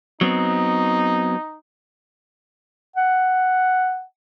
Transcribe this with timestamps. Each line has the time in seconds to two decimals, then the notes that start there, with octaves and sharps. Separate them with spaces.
0.21 F#3 B3 C4 D#4
2.96 F#5